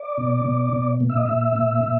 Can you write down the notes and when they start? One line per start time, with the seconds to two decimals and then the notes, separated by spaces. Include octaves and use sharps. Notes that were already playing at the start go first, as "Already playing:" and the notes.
Already playing: D5
0.18 B2
0.45 B2
0.73 B2
1.00 A#2
1.10 E5
1.17 D#5
1.26 A#2 E5
1.56 A#2
1.84 A#2